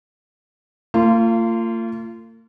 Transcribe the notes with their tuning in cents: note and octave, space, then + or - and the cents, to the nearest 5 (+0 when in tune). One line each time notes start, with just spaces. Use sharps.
A#3 -45 F4 -20